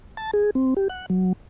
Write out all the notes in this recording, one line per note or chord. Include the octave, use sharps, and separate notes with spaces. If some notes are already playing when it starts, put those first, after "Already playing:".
A5
G#4
C4
G4
F#5
F#3